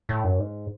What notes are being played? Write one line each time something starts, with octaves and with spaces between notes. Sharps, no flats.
A2
F#2
G#2